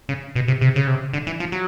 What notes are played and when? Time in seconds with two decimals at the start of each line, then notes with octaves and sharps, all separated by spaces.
0.09 C#3
0.36 B2
0.48 C3
0.61 C3
0.76 C#3
0.87 C3
1.13 D3
1.27 E3
1.40 F3
1.52 F#3